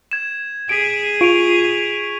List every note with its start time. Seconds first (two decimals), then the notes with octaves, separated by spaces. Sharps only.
0.11 G#6 E7
0.69 G#4 B6 D7
1.21 F4 C#6 D7 F7